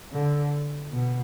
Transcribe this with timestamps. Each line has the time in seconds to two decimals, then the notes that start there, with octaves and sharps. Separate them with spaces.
0.13 D3
0.93 B2